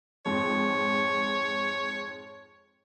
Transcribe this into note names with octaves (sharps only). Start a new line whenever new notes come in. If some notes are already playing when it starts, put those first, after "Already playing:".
F2 G#2 C#5